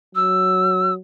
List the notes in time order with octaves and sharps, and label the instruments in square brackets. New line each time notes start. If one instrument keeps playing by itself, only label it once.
[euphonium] F#3 [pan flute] E6